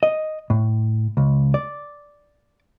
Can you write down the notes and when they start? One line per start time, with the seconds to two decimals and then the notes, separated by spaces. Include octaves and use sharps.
0.03 D#5
0.50 A2
1.17 C#2
1.54 D5